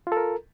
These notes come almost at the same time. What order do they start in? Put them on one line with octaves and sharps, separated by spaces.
F4 A4 A#4